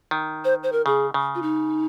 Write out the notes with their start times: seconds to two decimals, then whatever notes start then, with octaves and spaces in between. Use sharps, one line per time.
0.11 D#3
0.45 C5
0.63 C5
0.72 A#4
0.86 C#3 G#4
1.14 C#3
1.35 F4
1.42 D#4